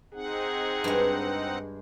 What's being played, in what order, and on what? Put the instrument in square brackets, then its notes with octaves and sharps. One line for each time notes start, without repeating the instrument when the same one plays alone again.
[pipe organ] C4 D#4 F#5 [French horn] G#4
[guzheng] G2 G#3